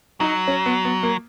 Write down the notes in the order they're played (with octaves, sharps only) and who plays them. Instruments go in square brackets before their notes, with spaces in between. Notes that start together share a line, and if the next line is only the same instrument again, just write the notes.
[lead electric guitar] F#3 [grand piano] D#4
[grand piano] C#4
B3
B3
A#3